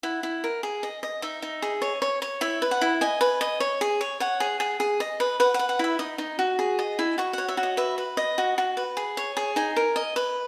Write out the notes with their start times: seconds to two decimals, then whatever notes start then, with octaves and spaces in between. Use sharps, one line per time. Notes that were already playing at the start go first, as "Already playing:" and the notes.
0.03 E4 F#5
0.23 E4
0.44 A#4
0.63 G#4
0.83 D#5
1.03 D#5
1.22 D#4 E5
1.42 D#4
1.62 G#4
1.82 C#5
2.02 C#5
2.22 C#5
2.41 E4 E5
2.62 B4
2.71 F#5
2.81 E4
3.01 D#5 G#5
3.21 B4
3.41 D#5
3.60 C#5
3.81 G#4
4.01 C#5
4.20 C#5 F#5
4.40 G#4
4.60 G#4
4.80 G#4
5.00 D#5
5.20 B4
5.40 B4 F#5
5.54 F#5
5.59 B4
5.69 F#5
5.79 E4 E5
5.99 D#4 D#6
6.18 D#4
6.39 F#4
6.59 G#4
6.79 D#5
6.99 E4
7.18 F#4 C#6
7.33 C#5 F#5
7.48 E5
7.57 F#4
7.63 D#5
7.77 B4 E5
7.98 B4
8.17 D#5
8.38 F#4
8.58 F#4
8.77 B4
8.97 G#4
9.17 C#5
9.37 G#4
9.56 D#4 G#5
9.76 A#4
9.96 D#5
10.16 B4